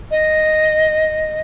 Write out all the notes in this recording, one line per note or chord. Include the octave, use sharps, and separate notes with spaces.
D#5